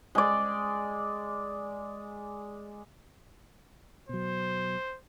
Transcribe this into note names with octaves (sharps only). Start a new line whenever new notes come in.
G#3 D5
B2 F#3 C5